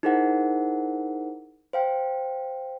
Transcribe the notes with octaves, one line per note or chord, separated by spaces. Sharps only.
D#4 E4 G#4 A#4 C5 F#5
C5 F5 G5